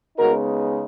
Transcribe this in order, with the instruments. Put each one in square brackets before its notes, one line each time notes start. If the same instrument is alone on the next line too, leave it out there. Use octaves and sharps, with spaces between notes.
[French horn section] C#3 G#3 B3 D#4 F#4 A#4